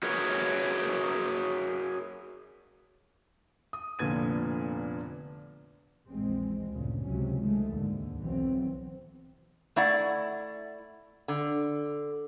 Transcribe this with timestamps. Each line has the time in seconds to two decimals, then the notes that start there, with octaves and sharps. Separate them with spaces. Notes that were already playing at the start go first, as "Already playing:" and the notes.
0.03 F#4 G#4 A#4 B4 C#5
3.73 D#6
3.99 F1 A#2 D3 B3 G#6 D#7
6.08 A#1 E2 G#3 C4
6.70 D2 G2 A#2 C#3
7.03 C#2 C3 F#3 C#4
7.39 D#3 G#3 A3
7.68 D#2 G#2 D3
8.17 B1 E3 F#3 C4
9.76 A3 E4 D5 F#5
11.28 D3